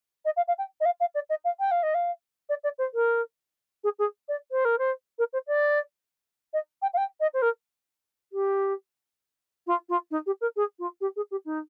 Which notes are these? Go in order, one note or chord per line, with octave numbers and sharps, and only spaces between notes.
D#5
F5
F5
G5
D#5
F5
F5
D5
D#5
F5
G5
F5
D#5
F5
D5
D5
C5
A#4
G#4
G#4
D5
C5
A#4
C5
A#4
C5
D5
D#5
G5
F5
G5
D#5
C5
A#4
G4
F4
F4
D#4
G4
A#4
G#4
F4
G4
G#4
G4
D#4